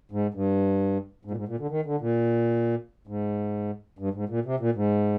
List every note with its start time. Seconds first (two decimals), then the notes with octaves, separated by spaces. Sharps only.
0.11 G#2
0.34 G2
1.25 G#2
1.31 A#2
1.37 G#2
1.48 A#2
1.59 D3
1.70 D#3
1.86 D3
2.01 A#2
3.07 G#2
3.99 G2
4.14 G#2
4.29 A#2
4.45 C3
4.60 A#2
4.75 G#2